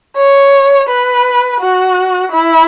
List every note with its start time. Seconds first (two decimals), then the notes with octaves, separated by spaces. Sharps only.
0.17 C#5
0.89 B4
1.60 F#4
2.32 E4